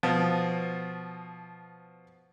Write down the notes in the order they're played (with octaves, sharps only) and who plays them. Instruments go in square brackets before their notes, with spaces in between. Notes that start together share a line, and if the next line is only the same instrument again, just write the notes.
[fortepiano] B2 F3